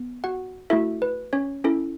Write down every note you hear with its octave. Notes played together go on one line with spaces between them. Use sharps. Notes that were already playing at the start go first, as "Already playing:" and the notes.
Already playing: B3
F#4 F#5
A3 E4 F#4 A4 E5
B4
C#4 C#5
C#4 E4 A4